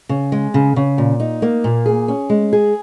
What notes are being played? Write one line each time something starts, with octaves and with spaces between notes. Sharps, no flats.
C#3
G#3
C#3
C#3
A#2
D#4
A#3
A#2
G#4
C#4
G#3
G#4